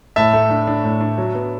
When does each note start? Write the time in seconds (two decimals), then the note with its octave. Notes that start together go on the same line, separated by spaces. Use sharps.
0.16 A2 E5 A5
0.33 A3
0.50 D4
0.67 D4
0.84 A2
1.01 D4
1.18 F#3
1.35 B3